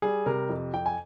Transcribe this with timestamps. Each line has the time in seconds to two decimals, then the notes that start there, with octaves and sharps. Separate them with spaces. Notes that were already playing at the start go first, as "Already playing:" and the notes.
0.02 G3 G#4
0.26 C3 A#4
0.49 F2
0.74 F2 G5
0.86 G#5